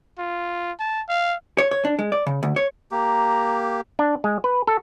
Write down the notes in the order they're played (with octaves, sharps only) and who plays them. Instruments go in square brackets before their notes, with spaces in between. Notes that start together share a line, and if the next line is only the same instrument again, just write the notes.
[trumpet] F4
A5
F5
[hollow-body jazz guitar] C#5
C#5
D4
G#3
D5
C#3
D2
C#5
[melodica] A#3 G4 [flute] A#5
[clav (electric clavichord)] D4
G#3
B4
A4